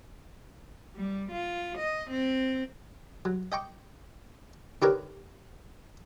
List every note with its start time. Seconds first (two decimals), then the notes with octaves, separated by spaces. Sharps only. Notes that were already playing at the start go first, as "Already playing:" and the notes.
0.95 G3
1.32 F4
1.78 D#5
2.10 C4
3.25 F#3
3.52 D#5 G5 C#6 D6
4.82 D3 D#4 G4 A#4 B4 C#5